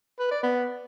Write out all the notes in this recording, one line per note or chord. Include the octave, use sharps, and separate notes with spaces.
B4
D5
B3